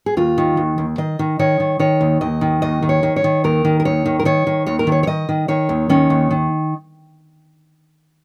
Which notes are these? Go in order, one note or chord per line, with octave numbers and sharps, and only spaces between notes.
G#4
D#2 F4
D#3
D#2
D#2
D#3 D#5
D#3
D#3 C#5
D#3
D#3 C#5
D#2
D#2 D#5
D#3
D#2 D#5
D#3
C#5
D#3
C#5
D#3
D#2 A#4
D#3
A#4
D#2 C#5
D#3
A#4
D#3 C#5
D#3
D#2 C#5
A#4
D#3
C#5
C#5
D#3 D#5
D#3
D#3 C#5
D#2
D#3 C#4
D#2
D#3